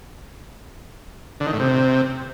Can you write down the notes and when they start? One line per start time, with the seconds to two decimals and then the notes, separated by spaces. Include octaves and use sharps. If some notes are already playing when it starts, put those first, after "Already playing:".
1.40 D3
1.47 D#3
1.53 A2
1.60 C3